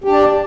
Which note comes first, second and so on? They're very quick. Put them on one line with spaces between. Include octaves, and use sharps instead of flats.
G4 D4 D5